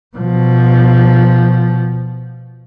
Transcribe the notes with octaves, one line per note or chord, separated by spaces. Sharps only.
B2 F3